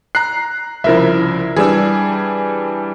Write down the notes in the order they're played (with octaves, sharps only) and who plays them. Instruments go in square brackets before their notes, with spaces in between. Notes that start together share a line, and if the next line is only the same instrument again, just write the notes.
[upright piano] A#5 F#6 [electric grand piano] C7
[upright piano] C2 C#3 F3 [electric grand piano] E4 A#4 E5
[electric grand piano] E3 G3 D4 [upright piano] G#4 G#5 E6